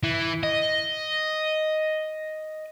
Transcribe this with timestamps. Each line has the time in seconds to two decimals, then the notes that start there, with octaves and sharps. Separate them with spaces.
0.03 E3
0.43 D#5